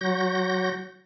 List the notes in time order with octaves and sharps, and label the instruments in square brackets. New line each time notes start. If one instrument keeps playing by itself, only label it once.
[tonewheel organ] F#3 F#4 G6 A#6